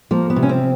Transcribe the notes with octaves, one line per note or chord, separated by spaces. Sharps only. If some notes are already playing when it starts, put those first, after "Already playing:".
F3 A#3
B3
C3
C#4
C4